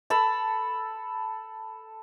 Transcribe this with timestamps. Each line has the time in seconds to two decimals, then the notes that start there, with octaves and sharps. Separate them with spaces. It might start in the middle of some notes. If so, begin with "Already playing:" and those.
0.10 A4 A5 B5